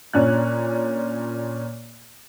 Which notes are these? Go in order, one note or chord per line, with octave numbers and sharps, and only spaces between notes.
A#2 C#4 D4 F#6